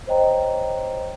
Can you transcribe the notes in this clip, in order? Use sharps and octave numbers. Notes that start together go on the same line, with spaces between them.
C5 C#5 D#5 G5 A#5